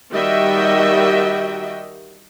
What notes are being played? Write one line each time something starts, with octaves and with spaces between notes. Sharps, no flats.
D#3 G3 F#4 D#5 E5 G5